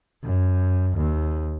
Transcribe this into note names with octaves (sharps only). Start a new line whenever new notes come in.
F#2
D#2